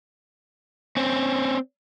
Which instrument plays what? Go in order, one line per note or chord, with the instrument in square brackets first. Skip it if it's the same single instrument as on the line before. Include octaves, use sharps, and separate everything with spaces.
[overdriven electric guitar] C4 C#4